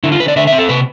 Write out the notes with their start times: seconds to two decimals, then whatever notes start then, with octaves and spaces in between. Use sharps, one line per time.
0.04 D3 E4
0.12 F4
0.19 D3 B4
0.28 D5
0.36 D3 E5
0.47 E5
0.53 C4
0.58 A4
0.69 C3 B4